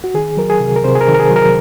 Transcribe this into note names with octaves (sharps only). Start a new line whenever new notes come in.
F#4
D#3 G#4
F#3 A#4
G#4
C3
A#4
C3 C5
G#4
A#4
D#3
A#4
G#4
F#3 A#4